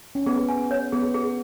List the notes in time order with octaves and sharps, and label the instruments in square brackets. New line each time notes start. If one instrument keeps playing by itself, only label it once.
[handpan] C#4
[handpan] B3 [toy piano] G#4
[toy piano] G#5
C#5
[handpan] B3 [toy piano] G#4
[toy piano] G#4